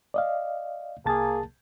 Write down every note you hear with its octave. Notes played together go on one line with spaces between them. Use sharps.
D5 D#5 F5
C2 A#3 G#4 A5 A6